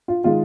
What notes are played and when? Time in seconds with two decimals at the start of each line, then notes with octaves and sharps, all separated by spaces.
0.08 F4
0.24 D#3 G#3 F4